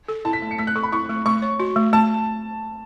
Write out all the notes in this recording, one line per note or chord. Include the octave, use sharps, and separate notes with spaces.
A4
E4 A5
B6
A3
C#7
A3 B6
F#6
A4 C#6
B5
E4 C#6
A3
A3 C#6
C#5
F#4
A3
A3 A5